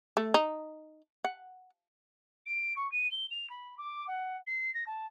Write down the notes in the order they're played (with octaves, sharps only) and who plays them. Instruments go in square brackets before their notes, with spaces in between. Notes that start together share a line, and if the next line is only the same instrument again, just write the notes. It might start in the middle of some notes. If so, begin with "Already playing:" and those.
[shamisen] A3
D#4
F#5
[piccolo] D7
C#6
D#7
G7
F7
B5
D6
F#5
C7
A#6
A5